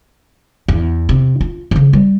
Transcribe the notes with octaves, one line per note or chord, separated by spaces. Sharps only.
E2
C3
F4
C#3 F3
G3